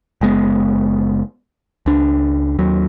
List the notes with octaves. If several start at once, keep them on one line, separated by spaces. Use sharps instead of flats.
F#1 G#3 B3
C#2 D4
D#2 F#3